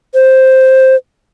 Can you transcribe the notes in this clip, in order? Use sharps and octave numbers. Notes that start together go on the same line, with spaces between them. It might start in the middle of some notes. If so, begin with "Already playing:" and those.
C5